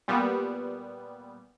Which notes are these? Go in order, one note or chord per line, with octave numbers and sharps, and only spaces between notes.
A#2 G3 B3